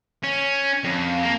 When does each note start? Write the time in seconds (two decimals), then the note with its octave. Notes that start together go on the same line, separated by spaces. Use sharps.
0.23 C#4
0.84 F2
1.23 A#3